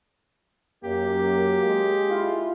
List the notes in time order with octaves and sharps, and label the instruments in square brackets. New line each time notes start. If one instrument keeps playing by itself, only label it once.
[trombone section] F#2 [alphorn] A#3 [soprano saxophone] G4
[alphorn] G#3
[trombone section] E4 F4